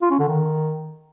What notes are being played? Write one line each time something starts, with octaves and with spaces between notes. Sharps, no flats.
F4
C#4
D3
D#3